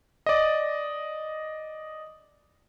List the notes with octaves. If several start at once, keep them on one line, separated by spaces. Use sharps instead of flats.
D5 D#5